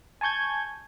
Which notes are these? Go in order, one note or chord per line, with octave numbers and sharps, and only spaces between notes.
G#5 A5 C#6 G6 G#6